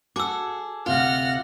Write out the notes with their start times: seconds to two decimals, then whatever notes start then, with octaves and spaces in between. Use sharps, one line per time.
0.16 F#4 G#4 A4 D6 E6
0.86 D2 C3 F4 F#5 F6 A#6